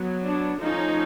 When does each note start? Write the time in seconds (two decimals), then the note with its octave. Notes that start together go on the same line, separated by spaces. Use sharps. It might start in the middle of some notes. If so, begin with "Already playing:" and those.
Already playing: F#3 B3
0.23 D4
0.59 F3 A3 C#4 D#4